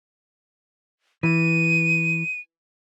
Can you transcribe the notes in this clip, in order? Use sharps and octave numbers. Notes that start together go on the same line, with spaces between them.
E3 D#7